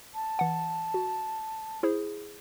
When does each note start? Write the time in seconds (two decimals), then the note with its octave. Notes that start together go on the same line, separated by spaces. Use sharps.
0.15 A5
0.39 E3 F#5
0.94 F#4
1.83 E4 G#4 C5